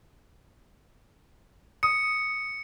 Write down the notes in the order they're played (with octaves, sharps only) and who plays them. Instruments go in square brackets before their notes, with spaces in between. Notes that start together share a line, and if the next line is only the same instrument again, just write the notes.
[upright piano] D#6 [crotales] C#7